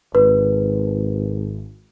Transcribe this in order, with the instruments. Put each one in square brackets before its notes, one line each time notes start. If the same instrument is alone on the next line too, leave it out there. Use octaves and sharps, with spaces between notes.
[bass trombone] G#1 [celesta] B4